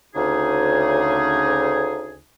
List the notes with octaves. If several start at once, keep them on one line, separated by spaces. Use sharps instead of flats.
D2 C#3 D#4 G#4